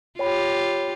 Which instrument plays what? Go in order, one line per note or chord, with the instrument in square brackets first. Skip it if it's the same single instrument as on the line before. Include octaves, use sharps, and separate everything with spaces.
[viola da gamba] F4 G4 [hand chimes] C#5 G5 B5